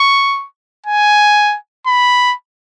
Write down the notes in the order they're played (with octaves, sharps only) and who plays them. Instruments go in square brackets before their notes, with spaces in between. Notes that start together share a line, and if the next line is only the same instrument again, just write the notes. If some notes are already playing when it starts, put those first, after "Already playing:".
Already playing: [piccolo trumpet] C#6
G#5
B5